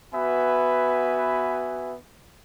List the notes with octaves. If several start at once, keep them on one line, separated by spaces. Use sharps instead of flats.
B3 F#4 B4 E5 G#5